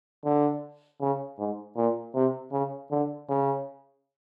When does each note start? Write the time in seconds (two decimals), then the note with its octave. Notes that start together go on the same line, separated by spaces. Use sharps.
0.24 D3
1.01 C#3
1.39 G#2
1.76 A#2
2.15 C3
2.52 C#3
2.91 D3
3.29 C#3